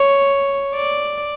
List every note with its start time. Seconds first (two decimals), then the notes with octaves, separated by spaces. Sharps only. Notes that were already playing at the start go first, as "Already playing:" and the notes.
Already playing: C#5
0.75 D5